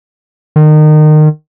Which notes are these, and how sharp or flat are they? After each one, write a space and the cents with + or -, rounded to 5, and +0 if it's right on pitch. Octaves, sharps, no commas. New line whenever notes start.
D#3 -30